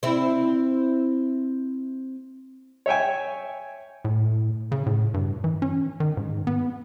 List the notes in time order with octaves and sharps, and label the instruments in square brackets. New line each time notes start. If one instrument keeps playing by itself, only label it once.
[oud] C4 E4
[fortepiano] C#5 E5 G5 G#5
[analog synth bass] A2
C#3
A2
G2
E3
C#4
D#3
G#2
B3